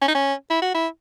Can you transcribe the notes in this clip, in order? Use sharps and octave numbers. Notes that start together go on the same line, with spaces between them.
C#4
D#4
C#4
E4
F#4
E4